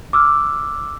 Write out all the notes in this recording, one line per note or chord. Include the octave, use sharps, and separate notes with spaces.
D6 E6 F6